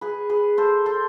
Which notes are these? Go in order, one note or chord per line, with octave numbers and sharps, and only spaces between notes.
G#4 B4
G#4 B4
A4 C5
A4 C5